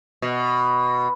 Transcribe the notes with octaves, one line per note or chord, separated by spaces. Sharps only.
B2